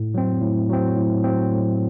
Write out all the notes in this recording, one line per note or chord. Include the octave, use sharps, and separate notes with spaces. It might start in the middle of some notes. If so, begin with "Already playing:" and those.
Already playing: A2
F#3 C4
A2
F#3 C4
A2
F#3 C4
A2